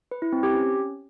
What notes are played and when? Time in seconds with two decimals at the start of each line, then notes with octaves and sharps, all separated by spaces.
0.11 B4
0.22 E4
0.33 C4
0.43 G4
0.54 C#4